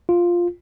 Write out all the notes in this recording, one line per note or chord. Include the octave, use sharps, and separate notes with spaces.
F4